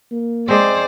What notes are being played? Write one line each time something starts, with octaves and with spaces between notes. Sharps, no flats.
A#3
G#3 C4 C5 D5